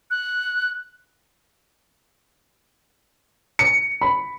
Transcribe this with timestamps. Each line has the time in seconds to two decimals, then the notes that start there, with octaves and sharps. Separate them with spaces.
0.11 F#6
3.59 C#7
4.01 B5